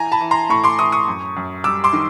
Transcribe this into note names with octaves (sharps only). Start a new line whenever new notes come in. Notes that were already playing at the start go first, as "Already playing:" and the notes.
Already playing: E3 G#5 A#5
A5 B5
E3
A#5 C6
A2 B5 C#6
C6 D6
E3 C#6 D#6
C#6 D#6
F#2
F#2
G3 D6 E6
C6 D6
D#3